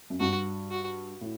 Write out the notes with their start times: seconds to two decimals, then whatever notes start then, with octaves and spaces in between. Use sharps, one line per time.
0.10 F#2
0.20 G2 F#4
0.71 F#4
1.21 A2